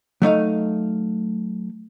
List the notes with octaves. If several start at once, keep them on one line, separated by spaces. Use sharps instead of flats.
F#3 A3 D#4 F5